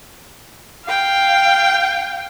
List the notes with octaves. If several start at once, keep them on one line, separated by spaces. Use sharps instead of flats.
F5 G5